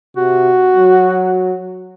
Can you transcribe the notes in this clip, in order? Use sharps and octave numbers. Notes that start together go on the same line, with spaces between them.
C3 F#4
F#3